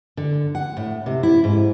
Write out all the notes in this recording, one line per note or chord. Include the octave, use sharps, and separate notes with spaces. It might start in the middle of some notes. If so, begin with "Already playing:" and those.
D3
F#5
A2
C3
E4
G#2